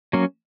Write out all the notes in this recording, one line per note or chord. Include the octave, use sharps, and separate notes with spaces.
F#3 A#3 C#4